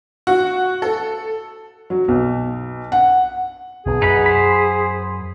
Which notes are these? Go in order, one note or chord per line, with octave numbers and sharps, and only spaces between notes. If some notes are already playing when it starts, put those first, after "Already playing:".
F#4
A4
F#3
B1
F#5
B1 B2 G#4
F#2 D#4 B4 B5
C5 B5